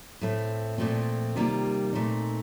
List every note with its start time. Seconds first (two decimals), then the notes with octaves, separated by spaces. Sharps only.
0.21 A2 A3 C4
0.78 A#2 F3 A3 C4
1.36 C3 D#3 G3 A#3 F4
1.93 A#2 A3 C4 D#4